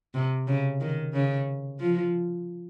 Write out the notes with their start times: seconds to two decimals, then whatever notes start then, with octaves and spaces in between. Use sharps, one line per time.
0.14 C3
0.47 C#3
0.81 D#3
1.13 C#3
1.80 F3